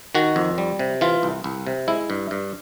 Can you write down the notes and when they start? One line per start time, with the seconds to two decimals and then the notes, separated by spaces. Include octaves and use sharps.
0.15 D#3 F#4
0.36 F2
0.58 G3
0.79 C3
1.01 E3 F4
1.23 C2
1.44 C2
1.67 C3
1.88 G#3 E4
2.10 G2
2.31 G2